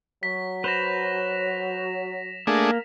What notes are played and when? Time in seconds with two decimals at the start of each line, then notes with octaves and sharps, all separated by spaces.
0.23 F#3 B6
0.64 B4 C5 A#6 E7 F7
2.47 A3 A#3 D4 G#4